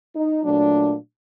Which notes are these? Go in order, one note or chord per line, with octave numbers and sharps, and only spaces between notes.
D#4
A#2 F#3 A3 D4